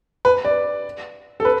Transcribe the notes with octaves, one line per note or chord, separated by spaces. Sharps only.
B4
D5
A4
B4